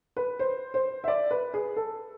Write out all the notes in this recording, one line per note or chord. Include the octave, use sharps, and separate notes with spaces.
B4
C5
C5
E5
D5
B4
G#4
A4